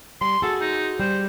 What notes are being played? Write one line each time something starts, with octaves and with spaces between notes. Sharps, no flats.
G3 C6
F#4 G#4 A4
D#4
G3 C5